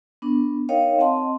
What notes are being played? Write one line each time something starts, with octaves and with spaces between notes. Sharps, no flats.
B3 D4
D#4 A#4 C#5 D#5 F5 G5
C4 D#5 F#5 A5 C6